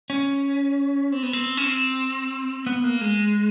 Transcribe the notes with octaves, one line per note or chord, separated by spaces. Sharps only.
C#4
C4
B3
C4
C#4
C4
B3
A#3
G#3